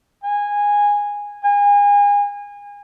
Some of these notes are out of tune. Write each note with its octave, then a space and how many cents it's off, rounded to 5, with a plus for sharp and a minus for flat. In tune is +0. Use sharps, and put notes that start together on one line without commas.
G#5 -15
G#5 -30